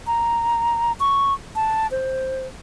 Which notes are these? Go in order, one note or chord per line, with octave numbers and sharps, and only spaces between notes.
A#5
C#6
A5
C5